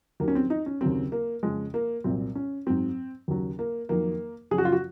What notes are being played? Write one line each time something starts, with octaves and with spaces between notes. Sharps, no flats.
D#2 D#3 F#3 A#3
C#4
C4
D#4
C#4
D#2 C#3 F#3 C4
A#3
F2 C#3 F3 G#3
A#3
C2 A#2 F#3 C4
C#4
G#2 F#3 C4
D#2 C#3 F#3
A#3
F2 D#3 F#3 A#3
F#2 C#3 F3 G#4
F#4
F4
F#4